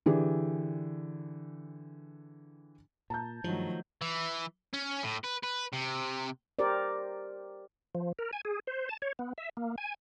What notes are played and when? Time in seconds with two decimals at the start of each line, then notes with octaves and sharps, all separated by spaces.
0.06 D3 E3 G4 G#4
3.10 A#2 A5 A#5 G6
3.44 G2 D#3 F3 F#3 A3
4.02 E3
4.73 C#4
5.03 A2
5.24 B4
5.44 B4
5.73 C3
6.59 G4 A#4 C5 D5
7.95 F3
8.19 A#4
8.33 G#5
8.45 G#4
8.67 C5
8.89 A5
9.02 C#5
9.19 B3
9.38 E5
9.57 A#3
9.78 G#5